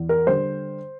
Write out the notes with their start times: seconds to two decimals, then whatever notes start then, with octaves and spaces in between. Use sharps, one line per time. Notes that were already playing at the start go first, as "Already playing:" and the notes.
Already playing: E2
0.09 A#4
0.27 D3 G3 C5